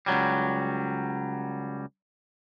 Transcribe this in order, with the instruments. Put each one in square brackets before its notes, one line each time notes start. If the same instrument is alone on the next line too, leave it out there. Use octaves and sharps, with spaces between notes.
[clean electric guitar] C#2 F#3 G3